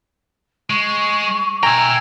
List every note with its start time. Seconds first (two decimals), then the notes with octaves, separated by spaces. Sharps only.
0.70 G#3 C#6
1.63 E5 G5 G#5 A#5 E6